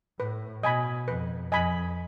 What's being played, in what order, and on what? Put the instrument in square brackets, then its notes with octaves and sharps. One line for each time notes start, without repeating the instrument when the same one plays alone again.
[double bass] A2 [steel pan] B4
[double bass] B2 [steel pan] D#5 G#5 B5
[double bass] F2 [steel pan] B4
[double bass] F2 [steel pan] D#5 G#5 B5